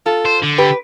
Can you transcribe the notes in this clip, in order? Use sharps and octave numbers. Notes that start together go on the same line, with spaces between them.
F4 A4
C5
D3
G4 B4